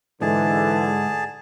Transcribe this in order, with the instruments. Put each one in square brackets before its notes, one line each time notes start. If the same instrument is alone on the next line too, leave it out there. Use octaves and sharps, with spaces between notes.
[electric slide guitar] G#2 [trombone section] D3 [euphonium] E3 [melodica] G#4 A5